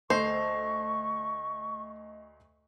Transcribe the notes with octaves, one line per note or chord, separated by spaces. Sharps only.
D2 A4 C5 D#5 C#6 C7